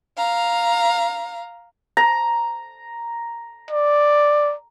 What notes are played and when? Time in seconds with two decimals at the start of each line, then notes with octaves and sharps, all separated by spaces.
0.17 F5 A#5
1.97 A#5
3.71 D5